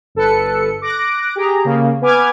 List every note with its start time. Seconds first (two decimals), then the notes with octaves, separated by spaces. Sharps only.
0.15 G1 A4 B4 C#7
0.82 D6 F#6 A#6 D7
1.36 G4 G#4 A#5
1.65 C#3 A#3
2.01 B3 B4 G#5 D6 F6 G#6